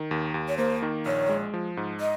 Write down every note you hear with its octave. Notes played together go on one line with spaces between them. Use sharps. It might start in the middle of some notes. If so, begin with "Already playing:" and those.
Already playing: D#3
D#2
D#2
C#5
A#3 C5
D#3
A#1 C#5
G#3
F3
G#2
D#5